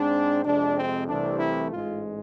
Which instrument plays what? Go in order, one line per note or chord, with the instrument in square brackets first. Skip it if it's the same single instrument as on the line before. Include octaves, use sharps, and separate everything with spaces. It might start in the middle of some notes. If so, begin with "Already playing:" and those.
Already playing: [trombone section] G#2 G#3 C4 D4
F2 C3 G#3 D4
C4
C2 C3 E3 A3 C4 D4
E4
A1 G#2 G#3 F4